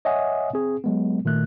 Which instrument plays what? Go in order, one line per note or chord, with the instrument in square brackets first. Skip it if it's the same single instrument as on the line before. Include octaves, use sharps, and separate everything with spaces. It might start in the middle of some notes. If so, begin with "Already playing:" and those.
[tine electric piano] C#5 D#5 E5 F#5 G#5 D#6
C4 G#4
F#3 G#3 B3
A#2 D#3 A3 F#6